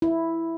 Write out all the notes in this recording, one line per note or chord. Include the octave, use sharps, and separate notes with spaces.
E4